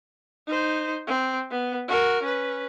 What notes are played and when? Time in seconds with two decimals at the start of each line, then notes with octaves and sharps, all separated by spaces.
0.47 D#4 C5
1.07 C4
1.51 B3
1.88 F#4 A#4
2.23 C#4 B4